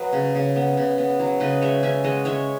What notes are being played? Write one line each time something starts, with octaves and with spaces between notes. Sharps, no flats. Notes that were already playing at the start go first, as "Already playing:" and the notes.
Already playing: F#3 B4 D#5
C#3
C#3
B3
C#3
B3
F#3
C#3 B4 D#5
G#3 C#5 E5
C#4 E5 G#5
G#3 D#5 F#5
G#3 C#5 E5